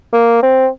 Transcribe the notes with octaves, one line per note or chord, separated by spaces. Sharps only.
A#3
C4